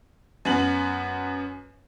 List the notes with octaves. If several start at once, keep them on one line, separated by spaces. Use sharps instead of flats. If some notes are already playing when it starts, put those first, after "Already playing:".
F#2 B3 F#7